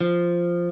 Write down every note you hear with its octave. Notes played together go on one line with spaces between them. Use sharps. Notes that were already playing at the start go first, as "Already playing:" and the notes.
F3